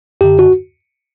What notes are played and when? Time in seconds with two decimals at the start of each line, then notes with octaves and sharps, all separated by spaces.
0.21 F#2 D3 G4
0.39 F#4